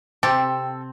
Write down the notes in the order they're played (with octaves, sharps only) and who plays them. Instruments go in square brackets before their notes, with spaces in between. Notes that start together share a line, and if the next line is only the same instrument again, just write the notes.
[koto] C3 G4 [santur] C4 [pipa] A4